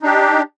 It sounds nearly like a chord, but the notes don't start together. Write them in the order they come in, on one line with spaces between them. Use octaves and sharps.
D#4 D4 G4